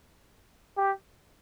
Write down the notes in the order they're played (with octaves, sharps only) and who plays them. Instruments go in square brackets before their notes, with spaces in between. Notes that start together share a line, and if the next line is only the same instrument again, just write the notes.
[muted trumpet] G4